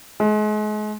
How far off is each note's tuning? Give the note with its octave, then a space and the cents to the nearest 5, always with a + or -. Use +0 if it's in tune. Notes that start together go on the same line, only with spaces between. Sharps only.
G#3 +35